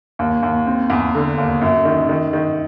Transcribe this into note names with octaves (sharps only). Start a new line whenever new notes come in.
D#2
D#2
C4
E2
D3
D#2
F#2
D#3
D#3
D#3